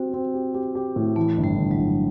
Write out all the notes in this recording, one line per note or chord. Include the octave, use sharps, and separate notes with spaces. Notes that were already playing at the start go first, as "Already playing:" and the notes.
Already playing: C4 F#4 G4
C4
G4
G4
G4
A2
E3 A3
G1
G3
G1
F#3
G1